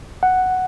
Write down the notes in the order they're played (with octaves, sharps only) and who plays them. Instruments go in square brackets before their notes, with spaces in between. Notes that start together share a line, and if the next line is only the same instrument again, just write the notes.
[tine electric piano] F#5